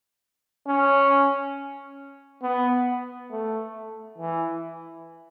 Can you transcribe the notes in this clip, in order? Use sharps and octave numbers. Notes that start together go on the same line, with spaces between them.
C#4
B3
A3
E3